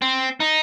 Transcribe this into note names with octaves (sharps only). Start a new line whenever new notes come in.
C4
D#4